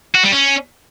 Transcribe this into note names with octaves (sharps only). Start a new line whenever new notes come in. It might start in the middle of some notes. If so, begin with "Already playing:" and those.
F#4
G3
C#4